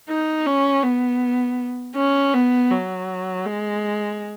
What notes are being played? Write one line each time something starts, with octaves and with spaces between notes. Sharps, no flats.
D#4
C#4
B3
C#4
B3
F#3
G#3